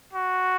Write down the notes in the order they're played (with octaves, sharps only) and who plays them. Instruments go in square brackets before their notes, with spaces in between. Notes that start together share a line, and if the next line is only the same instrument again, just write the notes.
[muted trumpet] F#4